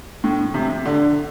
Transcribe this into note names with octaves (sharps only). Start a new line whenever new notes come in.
A2
C3
D3